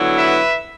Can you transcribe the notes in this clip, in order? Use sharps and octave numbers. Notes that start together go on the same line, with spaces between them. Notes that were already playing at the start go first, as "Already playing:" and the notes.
Already playing: D3 F#3 B3 E4
B4 E5